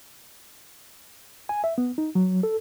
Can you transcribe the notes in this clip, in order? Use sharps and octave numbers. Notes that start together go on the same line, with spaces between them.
G#5
E5
B3
D#4
F#3
A4